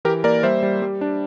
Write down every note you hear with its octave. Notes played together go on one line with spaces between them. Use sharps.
E3 G4 A#4
A#3 A#4 D5
G3 C5 E5
G3
G3
D4